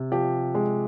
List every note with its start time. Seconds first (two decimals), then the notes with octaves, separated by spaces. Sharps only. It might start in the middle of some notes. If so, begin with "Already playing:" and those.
Already playing: C3
0.12 F3 G4
0.55 G#3